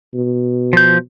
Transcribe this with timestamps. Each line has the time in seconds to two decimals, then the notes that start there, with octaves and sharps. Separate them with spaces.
0.14 B2
0.73 F3 G6